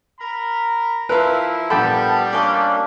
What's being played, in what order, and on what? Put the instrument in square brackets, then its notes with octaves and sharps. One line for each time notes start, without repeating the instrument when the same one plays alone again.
[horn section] A#4 A#5 B5
[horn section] F3 E4 [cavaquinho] A#4 F5 [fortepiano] B4 [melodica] E5
[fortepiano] A#1 G5 B5 [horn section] G3 [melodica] B3 G4 A5 [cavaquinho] A4
[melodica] A#3 C#4 D4 [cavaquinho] D5 D#5